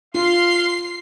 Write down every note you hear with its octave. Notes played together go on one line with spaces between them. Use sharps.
F4 F5 C6 C7